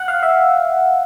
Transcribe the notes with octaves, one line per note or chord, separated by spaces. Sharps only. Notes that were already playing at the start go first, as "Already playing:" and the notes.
Already playing: F#5
F5
E5